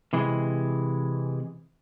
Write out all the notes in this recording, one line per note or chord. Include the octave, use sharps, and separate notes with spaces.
C3 E3 G#3